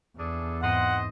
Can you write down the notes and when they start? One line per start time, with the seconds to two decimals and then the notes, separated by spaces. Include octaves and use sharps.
0.18 E2 D4 G#4 A4
0.62 G#2 C4 C5 D#5 F#5 C6